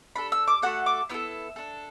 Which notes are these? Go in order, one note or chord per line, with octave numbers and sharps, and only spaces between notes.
D4 A4 B5
E6
D6
A3 F#4 A4 F#5
D6
B3 E4 A4 E6
D4 A4